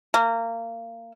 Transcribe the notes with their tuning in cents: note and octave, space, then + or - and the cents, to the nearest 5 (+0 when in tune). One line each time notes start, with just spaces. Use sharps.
A#3 -25